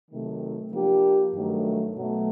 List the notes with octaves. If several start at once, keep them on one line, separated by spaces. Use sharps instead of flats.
C3 D#3 F#3 A3
F3 A#3 D4 G4
G2 D#3 F#3 A3
B2 F#3 A3